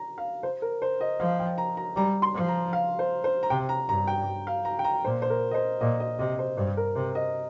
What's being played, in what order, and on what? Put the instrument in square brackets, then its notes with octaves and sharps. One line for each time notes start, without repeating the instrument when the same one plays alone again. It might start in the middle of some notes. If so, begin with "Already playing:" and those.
Already playing: [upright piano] A#5
F5
C5
A#4
C5
D#5
[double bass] F3 [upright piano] F5
[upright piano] G5
A#5
A#5
[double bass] G3 [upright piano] A#5
[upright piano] C6
[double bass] F3
[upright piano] A#5
F5
C5
C5
A#5
[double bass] C3 [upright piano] G5
[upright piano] A#5
[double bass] G2 [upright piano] A#5
[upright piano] G5
F5
A#5
G5
A#5
[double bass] A#2 [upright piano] C5
[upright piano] C5
A#4
D#5
C5
[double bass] A#2 [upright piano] D#5
[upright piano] D#5
[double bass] C3 [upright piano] D#5
[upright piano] C5
[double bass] G2 [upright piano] C5
[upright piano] A#4
[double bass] C3 [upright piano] C5
[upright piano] D#5